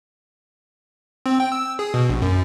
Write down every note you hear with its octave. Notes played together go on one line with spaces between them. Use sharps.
C4
G5
E6
G#4
B2
A#1
F#2